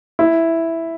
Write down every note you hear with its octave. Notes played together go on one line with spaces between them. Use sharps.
E4